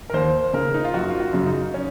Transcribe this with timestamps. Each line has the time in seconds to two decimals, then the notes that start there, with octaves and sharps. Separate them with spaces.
0.10 A#4
0.14 D#2 C5
0.53 C#3 A#4
0.74 D#4
0.84 F4
0.94 F#1 F#4
1.10 F4
1.20 F#4
1.33 F#2 C#3
1.46 D#4
1.74 C#4